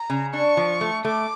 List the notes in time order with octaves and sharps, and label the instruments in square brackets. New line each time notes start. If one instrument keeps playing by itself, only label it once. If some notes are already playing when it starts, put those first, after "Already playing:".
Already playing: [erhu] A#5
[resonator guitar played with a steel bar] C#3
[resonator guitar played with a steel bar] D4 [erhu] C#6
[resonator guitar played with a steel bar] F3
A3
[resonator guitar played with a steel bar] A3 [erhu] D6